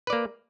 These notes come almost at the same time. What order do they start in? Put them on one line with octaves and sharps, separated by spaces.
B4 D5 A#3